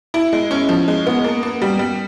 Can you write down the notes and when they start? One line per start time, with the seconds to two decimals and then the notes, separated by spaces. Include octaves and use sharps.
0.14 E4
0.33 G#3
0.51 C#4
0.69 F3
0.88 G#3
1.07 B3
1.24 A#3
1.43 A#3
1.62 G3
1.79 G3